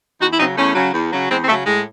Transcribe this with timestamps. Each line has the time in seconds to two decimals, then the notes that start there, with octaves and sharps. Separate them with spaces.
0.20 E2 D#4 F#4
0.31 E4
0.38 C#3 F#3 C4 D#4
0.56 E2 A3 C#4
0.74 C#3 F#3
0.93 E2
1.11 C#3 F#3
1.30 E2 G#3 C4
1.42 C4
1.47 C#3 F#3 A3
1.65 A2 G#3